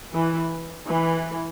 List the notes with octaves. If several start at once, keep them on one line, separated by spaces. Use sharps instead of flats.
E3
E3